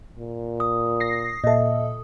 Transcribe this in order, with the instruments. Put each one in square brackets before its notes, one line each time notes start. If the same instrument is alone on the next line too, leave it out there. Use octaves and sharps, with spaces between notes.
[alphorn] A#2
[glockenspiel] D#6
[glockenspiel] D#6 [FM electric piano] A#6 C7
[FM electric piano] A#2 A4 [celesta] D#5 E5